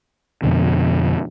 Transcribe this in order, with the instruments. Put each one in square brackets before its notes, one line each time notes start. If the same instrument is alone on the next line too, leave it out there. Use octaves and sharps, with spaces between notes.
[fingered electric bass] F2 B2 D3